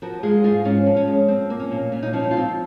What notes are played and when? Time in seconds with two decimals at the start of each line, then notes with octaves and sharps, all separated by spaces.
0.02 F3 F#4 A#4
0.23 G#3 F4 G#4
0.44 G#2 F4 G#4
0.65 G#2 C#4 F4
0.86 F3
0.96 C#4
1.07 G#3
1.28 F3 C4
1.50 A#3
1.60 C#4
1.71 A#2
1.92 A#2 C#4
2.03 D#4
2.13 F3 C#4
2.23 D#4
2.31 A#3 F4
2.37 C4 D#4